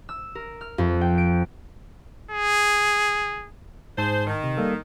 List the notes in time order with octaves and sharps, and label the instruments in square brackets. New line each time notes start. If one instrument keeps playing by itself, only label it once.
[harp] E6
A#4
F6
F2
G5
D7
[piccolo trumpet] G#4
[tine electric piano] G#2 A5 [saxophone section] G#4 C5
[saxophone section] D#3
[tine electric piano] C3
G3 A#3 A4